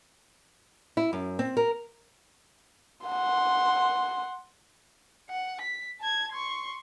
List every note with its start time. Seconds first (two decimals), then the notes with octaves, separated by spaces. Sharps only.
0.97 E4
1.13 F#2
1.39 C4
1.57 A#4
3.07 F#5 C6
5.30 F#5
5.61 B6
6.00 A5 G#6
6.32 C6 C#6